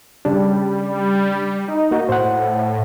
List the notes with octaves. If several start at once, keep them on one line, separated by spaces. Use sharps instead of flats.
C#3 G3 D4
D#4
A#3 F#4
A2 C5 F#5